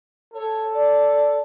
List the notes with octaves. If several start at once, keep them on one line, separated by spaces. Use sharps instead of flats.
A4 C#5
D5